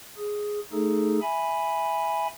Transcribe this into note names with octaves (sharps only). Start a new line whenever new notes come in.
G#4
A3 D#4 G#4 A4
E5 G#5 B5